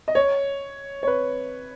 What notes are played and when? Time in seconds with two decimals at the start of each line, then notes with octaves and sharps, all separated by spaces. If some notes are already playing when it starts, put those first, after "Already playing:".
0.08 D#5
0.15 C#5
1.03 C#5
1.07 B4